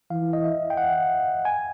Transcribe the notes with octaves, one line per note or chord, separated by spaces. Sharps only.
E3 F5
D#5
E5
G5
F#5
G#5